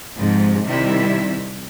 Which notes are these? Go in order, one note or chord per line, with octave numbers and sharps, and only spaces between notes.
G#2 C3 F3
C3 D#3 G3 E4 E5